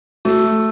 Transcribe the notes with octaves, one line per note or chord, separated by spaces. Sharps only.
A3 F#4